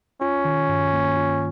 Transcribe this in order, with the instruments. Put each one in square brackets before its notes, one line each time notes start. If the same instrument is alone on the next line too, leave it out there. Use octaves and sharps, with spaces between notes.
[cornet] C#4 [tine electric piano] F4
[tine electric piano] D#3
G2
A#3
F4